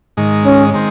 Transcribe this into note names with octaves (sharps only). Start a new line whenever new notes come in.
G#2 D#3 G#3
C#4
D#3 G#3 C4